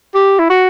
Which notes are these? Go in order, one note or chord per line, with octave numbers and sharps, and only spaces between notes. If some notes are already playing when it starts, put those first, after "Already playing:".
G4
E4
F#4